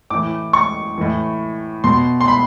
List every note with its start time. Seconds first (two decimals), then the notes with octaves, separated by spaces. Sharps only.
0.10 A2 E3 D6
0.53 C#6
0.98 A2 E3
1.84 B2 C6
2.21 C6
2.28 B5